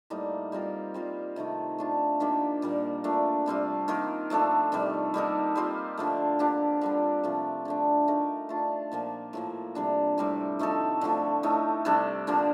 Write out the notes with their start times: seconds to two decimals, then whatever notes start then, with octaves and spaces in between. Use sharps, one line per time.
0.10 A2 G3 A#3 D#4
0.52 G3 C4 F4 A#4
0.94 G3 C4 F4
1.36 C3 D#3 A3 D#4
1.79 A3 D4 F4
2.20 D#3 A#3 D4 G4
2.62 A#2 G3 A#3
3.04 A#2 A3 D4
3.46 C3 G3 C4 F4
3.88 D#3 A#3 F4 A#4
4.30 F3 A3 D4 A4
4.72 C3 D#3 G3
5.14 G3 A#3 D#4 A4
5.55 G3 C4 F4 A#4
5.97 D3 F3 A3
6.39 F3 A#3 D4 G4
6.81 D3 G3 D4
7.24 C3 F3 A3
7.65 D3 A3 D4
8.08 A3 D#4 A#4
8.49 A3 D4 F4
8.92 A#2 F3 A#3
9.33 A2 F3 A#3
9.75 C3 G3 D4
10.18 A2 G3 C4 G4
10.59 F3 A3 D#4 A4
11.01 D3 F3 A3
11.43 A2 A3 D#4
11.85 C3 G3 D4 A4
12.27 D3 F3 A#3 D4